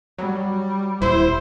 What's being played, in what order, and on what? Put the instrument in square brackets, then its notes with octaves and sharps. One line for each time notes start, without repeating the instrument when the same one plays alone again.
[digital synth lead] F#3 [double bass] G3
[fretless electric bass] D#1 [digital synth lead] E4 [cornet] C5